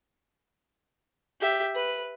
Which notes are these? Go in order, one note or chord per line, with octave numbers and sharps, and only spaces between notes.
G4 E5
B4